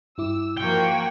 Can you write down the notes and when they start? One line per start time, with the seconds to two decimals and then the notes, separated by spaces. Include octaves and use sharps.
0.18 G2 E4 D6 E6
0.57 F3 A#3 F#4 F#5 G5 G#6